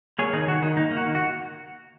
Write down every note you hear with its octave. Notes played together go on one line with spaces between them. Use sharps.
A#3 G#4 C#5
D#3 D#4 G#4
D#3 F#4
D#3 D#4
A#3 D#4
A#3
F#4
D#3
F#4